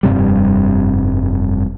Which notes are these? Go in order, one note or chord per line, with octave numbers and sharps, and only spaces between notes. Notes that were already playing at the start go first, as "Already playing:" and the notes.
F1 G2 C3 G3